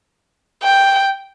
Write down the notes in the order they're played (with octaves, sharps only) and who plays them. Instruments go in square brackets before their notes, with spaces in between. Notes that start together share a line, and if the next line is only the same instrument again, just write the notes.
[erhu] G5